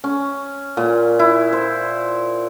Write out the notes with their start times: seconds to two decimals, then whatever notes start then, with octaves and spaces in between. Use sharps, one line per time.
0.04 C#4
0.77 A#2
1.19 E4
1.53 C5